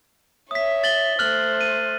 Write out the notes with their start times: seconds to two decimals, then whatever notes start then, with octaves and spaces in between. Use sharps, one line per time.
0.51 C#5 E5 D#6 B6
0.84 A6 F#7 G7
1.19 A3 C5 F6 F#6 F#7
1.61 D#7